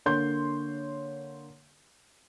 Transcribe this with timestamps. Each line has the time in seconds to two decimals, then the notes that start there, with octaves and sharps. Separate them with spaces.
0.06 D3 A#3 C#5 C6 G6